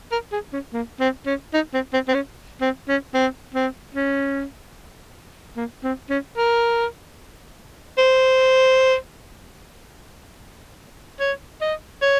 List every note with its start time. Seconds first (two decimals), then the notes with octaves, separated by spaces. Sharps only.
0.12 A#4
0.33 G#4
0.53 C#4
0.73 A#3
1.00 C4
1.26 C#4
1.54 D#4
1.74 C4
1.93 C4
2.08 C4
2.15 C#4
2.61 C4
2.89 C#4
3.14 C4
3.55 C4
3.95 C#4
5.57 A#3
5.84 C4
6.10 C#4
6.37 A#4
7.98 C5
11.20 C#5
11.61 D#5
12.02 C#5